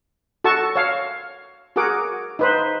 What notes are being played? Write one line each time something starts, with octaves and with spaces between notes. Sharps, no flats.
F#4 A4 A5 C#6
C#5 F5
F#4 G#4 A#4 F#5 D6
D#4 B4 C5